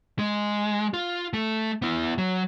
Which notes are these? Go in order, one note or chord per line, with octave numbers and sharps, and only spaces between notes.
G#3
F4
A3
B3 E4
F#3